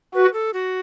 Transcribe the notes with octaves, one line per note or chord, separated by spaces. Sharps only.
F#4 B4
A4
F#4